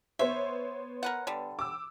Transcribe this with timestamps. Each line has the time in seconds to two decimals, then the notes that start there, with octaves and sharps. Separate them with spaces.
0.19 B3 C5 C#5 E5
1.03 A#4 B4 F#5
1.27 D3 G3
1.59 D6 E6